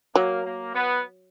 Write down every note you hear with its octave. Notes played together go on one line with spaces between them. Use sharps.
F#3 A#3
A#3
B3